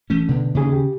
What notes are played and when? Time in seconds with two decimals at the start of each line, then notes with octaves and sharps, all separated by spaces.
0.10 E3 A3 C#4
0.29 B2 D3 B3
0.55 D#2 C#3 G#4
0.73 G4